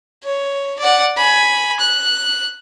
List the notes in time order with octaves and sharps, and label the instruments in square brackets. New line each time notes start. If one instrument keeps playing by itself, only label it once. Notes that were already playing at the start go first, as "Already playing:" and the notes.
[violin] C#5
D5 F#5
G#5 B5
F#6